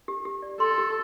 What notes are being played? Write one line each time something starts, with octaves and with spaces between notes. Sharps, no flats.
G4
G4
D5
A4 C6
G4